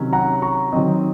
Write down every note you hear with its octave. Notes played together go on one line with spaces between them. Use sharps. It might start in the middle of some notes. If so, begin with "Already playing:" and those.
Already playing: C3 D#3 F#3 C#4
F#5 A#5
A#5 C#6
D#3 F#3 C4 D#5